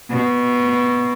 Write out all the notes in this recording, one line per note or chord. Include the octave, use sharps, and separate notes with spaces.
B2